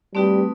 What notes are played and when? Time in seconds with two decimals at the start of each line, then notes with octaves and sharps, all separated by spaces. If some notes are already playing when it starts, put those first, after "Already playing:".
0.15 G3 A3 C4 D#4 F#4 B4